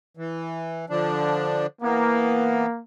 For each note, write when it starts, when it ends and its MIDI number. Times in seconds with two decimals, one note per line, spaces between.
0.17 0.86 52
0.90 1.66 50
0.90 1.66 53
0.90 1.66 62
1.82 2.66 52
1.82 2.82 58
1.82 2.66 59